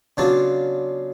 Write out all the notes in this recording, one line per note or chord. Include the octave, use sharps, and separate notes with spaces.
C#3 F#3 B3 D4 F4